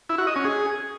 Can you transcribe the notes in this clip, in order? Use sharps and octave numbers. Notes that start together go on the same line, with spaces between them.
E4
F#4
D#5
C#4
G#4